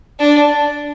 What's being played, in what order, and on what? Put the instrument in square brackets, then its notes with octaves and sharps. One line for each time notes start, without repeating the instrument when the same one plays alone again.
[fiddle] D4